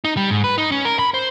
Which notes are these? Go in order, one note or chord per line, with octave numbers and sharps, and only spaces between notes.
D#4
G3
G#2
B4
D#4
C#4
A#4
B5
C5